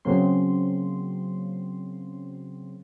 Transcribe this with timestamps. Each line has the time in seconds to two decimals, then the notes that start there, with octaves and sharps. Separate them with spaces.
0.05 C#3 F#3 A#3 C4 C6